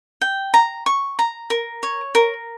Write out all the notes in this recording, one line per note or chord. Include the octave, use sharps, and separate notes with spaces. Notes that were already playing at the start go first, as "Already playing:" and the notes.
G5
A#5
C#6
A#5
A#4
C#5
A#4